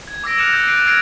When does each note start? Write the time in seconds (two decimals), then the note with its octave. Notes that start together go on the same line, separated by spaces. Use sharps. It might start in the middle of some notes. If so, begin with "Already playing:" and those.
0.07 G#6
0.24 D6 E6 A#6 D7
0.38 F6 F#6 C#7 E7 F7
0.52 E6 G6 A6
0.67 F#6 G6 C7 D7 D#7
0.87 F6 G#6 A#6 C7 D7